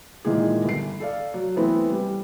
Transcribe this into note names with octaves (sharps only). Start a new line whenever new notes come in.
A#2 D#3 E3 G#3 G#4
G1 C7
A4 D5 F5
F#3
E3 A3 B3 C4 E4
G3